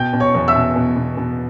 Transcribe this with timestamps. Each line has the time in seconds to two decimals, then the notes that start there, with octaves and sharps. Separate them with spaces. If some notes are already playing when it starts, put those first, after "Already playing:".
Already playing: B2 G5 G6
0.13 B2
0.20 C#5 C#6
0.34 E2
0.48 E5 E6
0.55 B2
0.76 B2
0.96 B2
1.17 B2